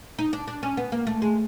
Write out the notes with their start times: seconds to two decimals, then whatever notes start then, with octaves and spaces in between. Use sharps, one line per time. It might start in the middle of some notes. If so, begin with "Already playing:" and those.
0.19 D#4
0.33 D4
0.48 D4
0.63 C#4
0.77 B3
0.92 A#3
1.07 A3
1.22 G#3